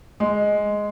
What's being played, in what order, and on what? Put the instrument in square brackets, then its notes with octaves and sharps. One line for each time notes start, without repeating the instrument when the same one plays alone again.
[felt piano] G#3